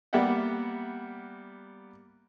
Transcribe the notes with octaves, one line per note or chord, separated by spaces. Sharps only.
G3 A#3 B3 E5 F#5 G5